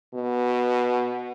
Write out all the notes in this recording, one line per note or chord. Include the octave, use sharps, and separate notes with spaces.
B2